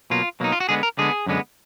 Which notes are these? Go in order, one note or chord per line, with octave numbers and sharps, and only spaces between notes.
B2 F#3 A#3 F4
B2 F#3 A#3 D#4
F4
F#4
D3 G#3 B3 G#4
A#4
D3 G#3 B3 G#4
F#2 D3 G#3 B3